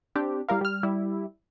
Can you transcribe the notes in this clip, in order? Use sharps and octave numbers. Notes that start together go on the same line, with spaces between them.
C4 D4 G4
G3 E4 A#4 F5
G3 F6
G3 E4